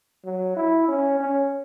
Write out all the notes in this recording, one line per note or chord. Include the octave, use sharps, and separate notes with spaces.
F#3
E4
C#4
C#4